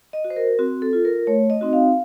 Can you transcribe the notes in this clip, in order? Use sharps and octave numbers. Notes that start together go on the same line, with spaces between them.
D#5
F#4
C5
A#4
C4 F#4
A4
F4
A#4
A3 C#5
D#5
C4 D#4 F#4
F5